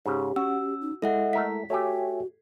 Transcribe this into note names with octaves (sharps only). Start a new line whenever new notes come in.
G#2 C#3 G4
C#4 F#4 E6
D#4
G#3 E4 A4 D#5 E5 F#5
A3 A#4 E5 B6
A3 F#4 G4 C#5 E5 G#5